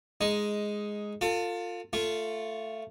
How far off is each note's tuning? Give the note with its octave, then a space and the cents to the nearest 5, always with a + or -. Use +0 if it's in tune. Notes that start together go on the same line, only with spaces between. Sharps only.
G#3 +0 D#4 +10
F4 +15 A4 +35
A3 +10 F4 -5